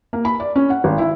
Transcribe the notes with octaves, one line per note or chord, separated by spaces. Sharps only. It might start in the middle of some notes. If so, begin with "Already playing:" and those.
A#3
B5
D5
C#4
F#5
G#1
E4